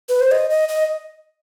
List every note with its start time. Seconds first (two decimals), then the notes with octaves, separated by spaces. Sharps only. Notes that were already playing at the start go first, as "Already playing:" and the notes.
0.09 B4
0.20 C5
0.31 D#5
0.50 D#5
0.68 D#5